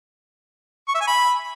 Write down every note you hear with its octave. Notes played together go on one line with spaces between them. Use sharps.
C#6
E5
G#5
B5